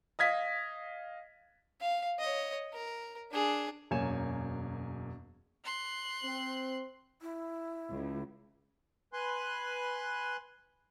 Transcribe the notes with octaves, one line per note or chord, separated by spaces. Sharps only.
D#5 F5 G#6 B6
F5
C#5 D#5
A#4
D4 G#4
E1 F#2 A#3 C#5 G#5 E7
C6 F#6
C4
E4
C#2
B4 G#5 C6 F#6